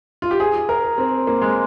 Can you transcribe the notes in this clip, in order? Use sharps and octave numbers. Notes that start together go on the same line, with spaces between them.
F4
G4
G#4
A#4
C4
A#3
G#3